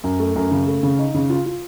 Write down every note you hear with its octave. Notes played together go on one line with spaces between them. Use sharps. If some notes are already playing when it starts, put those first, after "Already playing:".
F#2
A3
F#2
C#3
A3
C#3
D#4
C#3
F4
F4